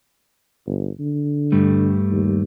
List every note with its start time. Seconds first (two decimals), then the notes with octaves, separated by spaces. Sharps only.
0.66 G1
1.00 D3
1.52 G2 G3 A3
2.11 D#2